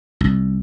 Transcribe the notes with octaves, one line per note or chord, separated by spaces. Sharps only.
C2